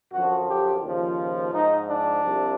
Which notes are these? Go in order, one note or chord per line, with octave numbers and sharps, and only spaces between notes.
F#2 D3 F3 F#4
G4
D#2 C#3 F3
G#2 F3 D#4
D4
C2 C3 F3